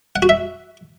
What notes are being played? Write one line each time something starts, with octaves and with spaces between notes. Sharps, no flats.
F#5
F#4
E5